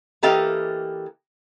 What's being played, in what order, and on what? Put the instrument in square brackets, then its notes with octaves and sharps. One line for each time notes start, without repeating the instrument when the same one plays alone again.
[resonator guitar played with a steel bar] E3 A#3 G4 A4 D#5 F5